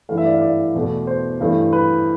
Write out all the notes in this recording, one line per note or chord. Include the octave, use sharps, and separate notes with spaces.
G2 E3 A3 F5
E5
D5
F5
D5
E2 B2 A3
C5
G2 E3 A3
B4